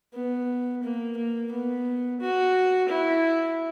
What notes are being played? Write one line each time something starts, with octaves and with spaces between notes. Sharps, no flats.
B3
A#3
A#3
B3
F#4
E4